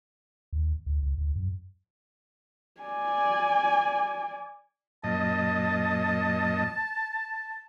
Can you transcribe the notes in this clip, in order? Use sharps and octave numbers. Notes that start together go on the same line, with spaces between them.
D#2
D2
C#2
D2
F#2
D5 G#5
F#2 A#2 D#5 A5